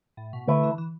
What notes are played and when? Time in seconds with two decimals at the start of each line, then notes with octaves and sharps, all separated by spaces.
0.17 A2
0.33 B2
0.48 D3 A3 E4 B4
0.63 E3
0.78 E3